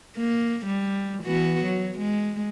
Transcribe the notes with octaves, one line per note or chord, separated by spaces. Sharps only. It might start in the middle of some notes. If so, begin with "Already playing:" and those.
A#3
G3
E3 B3 F#4
F#3
G#3